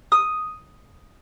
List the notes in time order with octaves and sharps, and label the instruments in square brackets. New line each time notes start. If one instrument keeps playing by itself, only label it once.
[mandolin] D#6